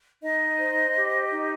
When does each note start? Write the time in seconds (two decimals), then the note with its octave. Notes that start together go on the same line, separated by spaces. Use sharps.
0.21 D#4 D#5
0.58 C5
0.95 G4
1.32 D#4